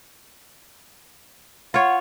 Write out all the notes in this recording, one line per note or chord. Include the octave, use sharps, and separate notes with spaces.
F4 C#5 F#5